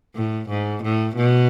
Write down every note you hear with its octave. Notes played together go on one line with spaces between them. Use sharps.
A2
G#2
A2
B2